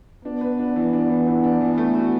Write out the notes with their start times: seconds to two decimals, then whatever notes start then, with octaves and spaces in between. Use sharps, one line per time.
0.24 B3 D4
0.41 B4
0.59 D4
0.76 E3
0.93 D4
1.09 E3
1.27 E3
1.44 D4
1.61 E3
1.78 A3
1.95 F#4